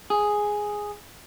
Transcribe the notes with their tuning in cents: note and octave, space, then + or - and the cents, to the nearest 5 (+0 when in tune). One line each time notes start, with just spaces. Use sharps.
G#4 +0